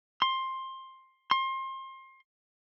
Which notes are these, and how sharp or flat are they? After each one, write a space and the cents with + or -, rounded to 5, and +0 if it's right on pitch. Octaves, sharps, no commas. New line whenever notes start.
C6 +15
C6 +30